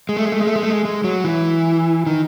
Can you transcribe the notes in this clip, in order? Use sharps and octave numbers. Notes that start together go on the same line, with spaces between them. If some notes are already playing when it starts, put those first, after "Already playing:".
G#3
A3
G#3
A3
G#3
A3
G#3
A3
G#3
G#3
F#3
E3
D#3